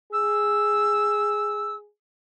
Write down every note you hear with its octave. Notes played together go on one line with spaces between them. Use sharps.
G#4 E6